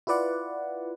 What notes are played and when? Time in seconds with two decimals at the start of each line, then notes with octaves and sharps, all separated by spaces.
0.07 E4 F4 B4 D5 F#5